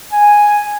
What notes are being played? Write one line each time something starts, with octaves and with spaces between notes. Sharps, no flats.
G#5